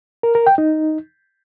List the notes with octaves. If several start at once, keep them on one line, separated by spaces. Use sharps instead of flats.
A#4
A#4
G5
D#4